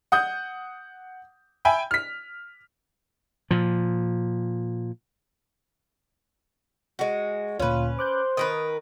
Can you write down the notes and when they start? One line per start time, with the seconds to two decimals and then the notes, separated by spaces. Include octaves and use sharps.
0.12 F#5 D#6 G6
1.65 E5 G5 G#5 B5
1.91 F6 B6
3.51 A#2 F3
6.99 G#3 F#4
7.60 D2 A#2 C#4 F4 B4
7.99 C5 D6 F#6 G6
8.37 D#3 A#4 B4 D#6